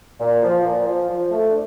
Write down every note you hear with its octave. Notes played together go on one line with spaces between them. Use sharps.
A#2
F3
A#2
F3
F3
A3
D4